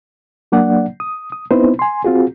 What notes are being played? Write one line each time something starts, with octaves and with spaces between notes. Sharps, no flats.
F#3 A#3 D4 D5 F#5
D#6
D#6
B3 C4 D#4 E4 B4 C5
G#5 C6
C4 F4 F#4 G#4